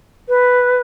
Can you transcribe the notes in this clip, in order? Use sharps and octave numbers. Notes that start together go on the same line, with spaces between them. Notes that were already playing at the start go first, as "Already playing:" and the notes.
B4